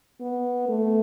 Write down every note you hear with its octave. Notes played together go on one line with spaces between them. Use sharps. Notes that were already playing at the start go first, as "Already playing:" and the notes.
B3
A3